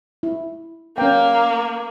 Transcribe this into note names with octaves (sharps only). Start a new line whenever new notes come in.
E4
A#3 C#4 G5